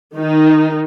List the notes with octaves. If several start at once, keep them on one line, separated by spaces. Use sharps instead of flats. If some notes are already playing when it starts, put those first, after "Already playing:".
D#3 D#4